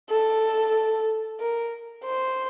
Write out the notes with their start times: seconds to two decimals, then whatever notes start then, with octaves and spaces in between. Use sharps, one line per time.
0.10 A4
1.40 A#4
2.04 C5